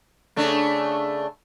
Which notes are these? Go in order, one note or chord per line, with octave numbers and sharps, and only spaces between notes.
C#3 A3 D4